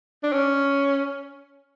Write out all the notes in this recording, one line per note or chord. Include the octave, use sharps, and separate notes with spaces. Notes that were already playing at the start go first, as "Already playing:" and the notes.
D4
C#4